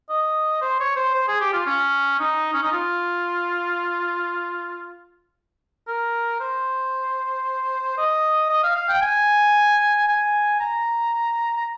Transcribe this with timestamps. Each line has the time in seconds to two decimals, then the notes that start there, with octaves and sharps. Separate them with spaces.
0.10 D#5
0.61 C5
0.80 C#5
0.96 C5
1.14 C5
1.28 G#4
1.40 G4
1.53 F4
1.66 C#4
2.19 D#4
2.53 C#4
2.63 D#4
2.72 F4
5.88 A#4
6.40 C5
7.97 D#5
8.49 D#5
8.63 F5
8.75 F5
8.89 G5
9.01 G#5
10.08 G#5
10.60 A#5
11.57 A#5